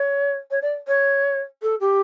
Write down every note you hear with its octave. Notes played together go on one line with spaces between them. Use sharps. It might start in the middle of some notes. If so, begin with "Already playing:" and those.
Already playing: C#5
C#5
D5
C#5
A4
G4